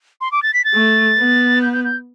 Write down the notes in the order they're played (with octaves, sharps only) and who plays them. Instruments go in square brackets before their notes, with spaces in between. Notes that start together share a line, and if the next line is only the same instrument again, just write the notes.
[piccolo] C6
D6
A6
B6
A6
[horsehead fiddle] A3
B3
[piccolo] G6
G6
G6